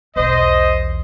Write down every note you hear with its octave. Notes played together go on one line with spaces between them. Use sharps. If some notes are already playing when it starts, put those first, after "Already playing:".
B1 E2 C5 D#5